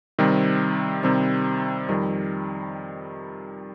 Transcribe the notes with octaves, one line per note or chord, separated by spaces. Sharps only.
C3 D#3 G3 C4
C3 D#3 G3 C4
F2 D#3 G3